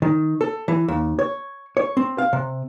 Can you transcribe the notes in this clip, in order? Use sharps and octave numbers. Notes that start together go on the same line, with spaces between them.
D#3
A4
E3
D#2
C#5
C#5
C4
F5
C3